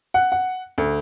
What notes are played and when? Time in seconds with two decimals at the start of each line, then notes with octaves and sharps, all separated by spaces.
0.14 F#5
0.32 F#5
0.78 D2